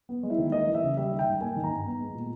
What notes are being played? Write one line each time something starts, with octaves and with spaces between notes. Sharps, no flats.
B3
G#3
E4
D#3
A#3 D#5
E3
E5
C#3
G3 E5
D#3
G5
G#2
A#3 G#5
D#3
A#5
G2
B3
G#3
A#2